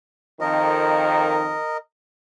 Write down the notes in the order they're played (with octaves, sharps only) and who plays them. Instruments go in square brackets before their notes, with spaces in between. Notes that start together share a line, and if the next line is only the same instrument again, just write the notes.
[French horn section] F2 D#3 [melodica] A#4 D#5